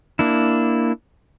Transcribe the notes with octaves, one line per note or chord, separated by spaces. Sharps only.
A#3 D4 E4